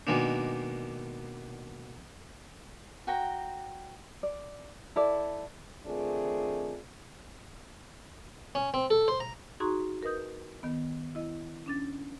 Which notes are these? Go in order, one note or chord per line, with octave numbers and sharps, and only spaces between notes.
B2 D#3 G#3 A#3 D4
F#4 G5 A#5
D5
E4 A4 D5
D#3 A3 C4 D4 F4 G#4
C#4
C4
A4
C5
A#5
D#4 F#4 G#4 A#5 C6 C#6
A#4 B4 D#5 D#6 G6
D#3 B3
E4 D#5
C#4 D4 A6